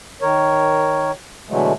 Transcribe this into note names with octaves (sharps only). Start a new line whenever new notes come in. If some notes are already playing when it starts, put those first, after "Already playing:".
D#3 A#4 C#5
B2 D3 E3 F#3 G#3 A3